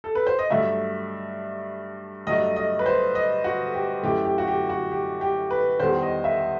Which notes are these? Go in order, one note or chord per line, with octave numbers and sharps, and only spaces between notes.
A4
B4
C5
D#5
G2 F#3 A3 E5
G2 F#3 A3 D#5
D#5
B4
C5
D#5
F#4
G4
F#2 E3 A3 G4
G4
F#4
G4
F#4
G4
G4
B4
E2 D#3 G3 C5
D#5
E5